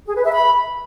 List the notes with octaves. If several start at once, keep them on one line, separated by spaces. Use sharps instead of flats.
G#4
B4
E5
B5